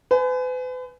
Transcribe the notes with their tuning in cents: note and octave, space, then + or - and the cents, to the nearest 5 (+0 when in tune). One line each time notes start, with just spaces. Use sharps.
B4 +40 G#5 +20